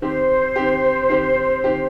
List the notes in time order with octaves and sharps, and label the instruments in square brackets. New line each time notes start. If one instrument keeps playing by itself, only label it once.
[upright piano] D#3 C4 G4 [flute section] C5
[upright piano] D#3 C4 G4
D#3 C4 G4
D#3 C4 G4